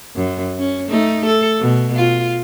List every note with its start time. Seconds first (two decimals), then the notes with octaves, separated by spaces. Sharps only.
0.15 F#2
0.58 C#4
0.88 A3 D#4
1.26 A4
1.60 B2
1.96 F4